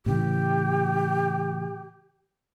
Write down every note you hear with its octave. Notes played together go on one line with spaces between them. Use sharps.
A2 C#3 E3 G4